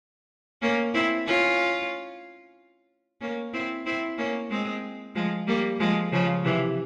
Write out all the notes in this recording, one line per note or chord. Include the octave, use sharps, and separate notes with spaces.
A#3 C#4
C4 E4
C#4 F4
A#3 C#4
C4 E4
C4 E4
A#3 C#4
G#3 C4
F3 G#3
G3 A#3
F3 G#3
C#3 F3
C3 E3